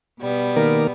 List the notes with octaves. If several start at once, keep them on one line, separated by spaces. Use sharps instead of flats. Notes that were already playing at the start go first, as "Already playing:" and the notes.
B2 G3 B3
D#3 A#3 A#4